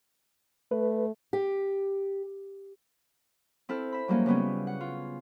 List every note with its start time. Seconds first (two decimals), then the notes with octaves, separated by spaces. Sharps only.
0.71 A3 B4
1.33 G4
3.69 C4 E4 A4 F6
3.92 E5 B5
4.08 F#3 G3 A#3 C#4
4.26 C#3 G3 B3 C#4
4.67 F#5
4.81 F4